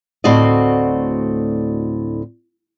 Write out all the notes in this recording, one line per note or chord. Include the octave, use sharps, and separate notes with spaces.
D2 A2 C4 F#4 D5 D#5